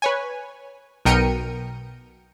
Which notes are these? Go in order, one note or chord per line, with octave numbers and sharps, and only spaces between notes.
B4 C#5 G#5
B1 B2 A#4 G5 C#7 D#7